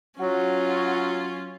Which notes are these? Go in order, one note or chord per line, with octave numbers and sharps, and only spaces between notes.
F#3 C#4 F4 F#4